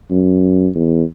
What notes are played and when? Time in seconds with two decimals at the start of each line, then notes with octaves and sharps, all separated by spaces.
0.11 F#2
0.75 E2